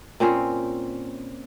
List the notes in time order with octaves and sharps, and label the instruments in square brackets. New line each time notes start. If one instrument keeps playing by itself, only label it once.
[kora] A#2 C4 C#4 C5